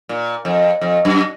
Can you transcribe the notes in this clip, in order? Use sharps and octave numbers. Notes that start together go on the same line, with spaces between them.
A#2
F2
F2
F#2